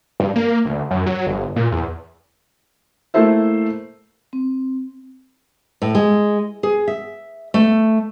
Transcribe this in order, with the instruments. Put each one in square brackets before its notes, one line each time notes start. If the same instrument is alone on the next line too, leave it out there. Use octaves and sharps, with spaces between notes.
[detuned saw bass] G2
A#3
D2
F#2
F#3
G1
A#2
E2
[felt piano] A3 A#3 E4 A4 C5 E5
[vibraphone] C4
[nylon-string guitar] A2
G#3
G#4
E5
A3